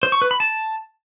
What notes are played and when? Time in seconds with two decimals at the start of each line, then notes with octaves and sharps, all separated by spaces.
0.03 C5
0.12 C#6
0.22 B4
0.31 B5
0.40 A5